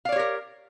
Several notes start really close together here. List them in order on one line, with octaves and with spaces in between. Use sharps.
F5 D5 C#5 G4 A#4